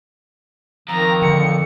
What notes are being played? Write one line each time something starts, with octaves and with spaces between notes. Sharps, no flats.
F2 D#3 A#5
D3 C#7